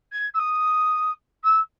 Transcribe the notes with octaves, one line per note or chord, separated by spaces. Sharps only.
G#6
E6
D#6
E6